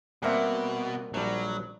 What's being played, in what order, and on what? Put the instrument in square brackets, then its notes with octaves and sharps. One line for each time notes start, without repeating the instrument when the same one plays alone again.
[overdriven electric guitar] B2 [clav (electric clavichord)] G3 A#3 C4 [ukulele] E5 G#5
[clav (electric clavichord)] A#1 G3 [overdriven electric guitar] F#3 [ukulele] C5 C#5 A5